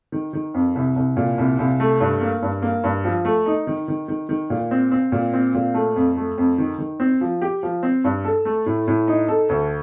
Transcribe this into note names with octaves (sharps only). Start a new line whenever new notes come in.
D#3
D#3
F2
C2
C2
A#2
C2
C2
A3
G2
A#3
G2
A#3
G2
F3
A3
D#4
D#3
D#3
D#3
D#3
A#2
C4
C4
A#2
C4
A#2
A3
F2
A3
F2
D#3
D#3
C4
F3
G4
F3
C4
G2
A4
A3
A2
A2
D#4
A4
D2